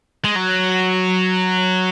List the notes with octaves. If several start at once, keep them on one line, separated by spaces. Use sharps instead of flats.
G#3
F#3